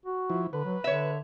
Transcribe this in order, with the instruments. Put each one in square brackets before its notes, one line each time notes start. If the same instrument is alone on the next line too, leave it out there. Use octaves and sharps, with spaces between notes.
[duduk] F#4
[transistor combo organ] F3 E4
[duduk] D3 [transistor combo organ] B4
[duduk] F#3
[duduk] D3 [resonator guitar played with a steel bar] C#5 E5